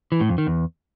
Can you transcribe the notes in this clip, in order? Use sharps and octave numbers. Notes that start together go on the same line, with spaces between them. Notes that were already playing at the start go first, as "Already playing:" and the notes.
E3
A2
F2
D#3
E2